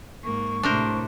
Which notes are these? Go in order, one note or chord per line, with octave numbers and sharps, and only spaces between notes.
G#2 A#3 C#6
A2 C3 A3 D4 A#4 C5